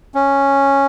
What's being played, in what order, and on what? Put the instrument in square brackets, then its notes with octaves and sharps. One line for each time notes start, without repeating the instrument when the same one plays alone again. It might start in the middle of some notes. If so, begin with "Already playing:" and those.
[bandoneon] C#4